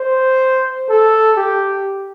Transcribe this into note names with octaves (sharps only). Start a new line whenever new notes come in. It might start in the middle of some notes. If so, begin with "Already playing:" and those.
Already playing: C5
A4
G4